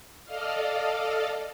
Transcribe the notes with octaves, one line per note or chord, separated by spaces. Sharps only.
A4 D5 D#5 F5 F6